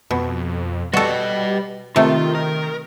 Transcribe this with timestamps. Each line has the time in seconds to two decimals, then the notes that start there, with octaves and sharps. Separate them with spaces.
0.11 F2 B2
0.94 G3 F#4 A4 B4 D#5
1.96 C3 D#3 A3 F4
2.35 A#4